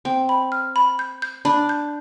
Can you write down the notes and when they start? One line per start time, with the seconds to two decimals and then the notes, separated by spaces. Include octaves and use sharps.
0.05 C4 G5
0.29 B5
0.52 F6
0.76 B5
0.99 G6
1.22 G6
1.45 D4 B5
1.69 G6